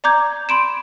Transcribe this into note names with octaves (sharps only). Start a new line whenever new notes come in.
D5 A#5 D6 G6 G#6
B5 C6 D7 E7